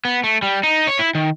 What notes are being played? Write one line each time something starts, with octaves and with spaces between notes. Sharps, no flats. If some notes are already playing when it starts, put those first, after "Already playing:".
B3
A3
G3
D#4
C#5
E4
D#3